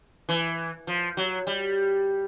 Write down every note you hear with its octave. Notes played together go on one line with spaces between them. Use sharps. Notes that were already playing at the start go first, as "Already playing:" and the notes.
E3
F3
F#3
G3